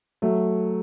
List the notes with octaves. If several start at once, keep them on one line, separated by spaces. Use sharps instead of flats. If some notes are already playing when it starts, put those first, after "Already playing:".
F#3 A3